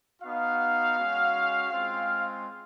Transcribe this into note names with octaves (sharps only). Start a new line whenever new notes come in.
B3 D#4 F#4 F5
G#3 C#4 F#4
G#3 C4 F4